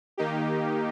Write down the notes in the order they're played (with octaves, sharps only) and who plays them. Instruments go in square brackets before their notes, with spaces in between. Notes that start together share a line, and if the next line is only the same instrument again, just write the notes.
[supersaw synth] D#3 A#3 D#4 G4